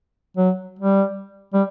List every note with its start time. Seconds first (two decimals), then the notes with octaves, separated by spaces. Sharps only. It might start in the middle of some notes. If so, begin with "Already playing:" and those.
0.37 F#3
0.79 G3
1.53 G3